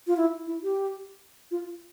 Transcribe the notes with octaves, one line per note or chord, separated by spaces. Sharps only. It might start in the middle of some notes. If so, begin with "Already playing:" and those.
F4
E4
E4
G4
F4